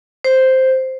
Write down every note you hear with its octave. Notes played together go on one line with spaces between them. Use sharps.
C5